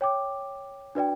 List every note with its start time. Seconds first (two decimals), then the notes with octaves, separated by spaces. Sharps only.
0.01 C#5 G5 D6
0.95 D4 F#4 B4 D5 G5